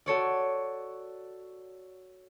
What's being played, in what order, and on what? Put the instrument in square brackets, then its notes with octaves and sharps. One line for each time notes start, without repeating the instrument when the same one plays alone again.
[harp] F#4 A4 C#5 D5